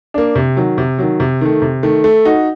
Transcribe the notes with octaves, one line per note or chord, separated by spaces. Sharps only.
A#3 D4
C3
D#3 F#3
C3
D#3 F#3
C3
D#3 A3
C3
D#3 A3
A3
D#4 F#4